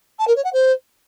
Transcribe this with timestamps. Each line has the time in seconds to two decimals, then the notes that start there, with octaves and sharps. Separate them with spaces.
0.19 A5
0.27 A#4
0.36 C#5
0.44 F#5
0.53 C5